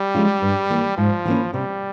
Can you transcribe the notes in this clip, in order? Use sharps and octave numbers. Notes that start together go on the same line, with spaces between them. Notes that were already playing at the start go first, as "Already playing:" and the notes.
Already playing: G3
F3 G#3 C#4 F4
G2
E3 A#3
G#2 F3
E3 A#3 C#4
C3 G3